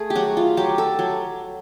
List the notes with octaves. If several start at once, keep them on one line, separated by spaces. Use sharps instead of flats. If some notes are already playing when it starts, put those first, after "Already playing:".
Already playing: A3 G#4
G4
F#3 F#4
F4
F#3 G4
A4
F#3